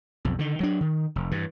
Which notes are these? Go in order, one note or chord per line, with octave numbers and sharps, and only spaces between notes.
B1 F2
D3 D#3
F#3 D4
D#3
F1
G2 E3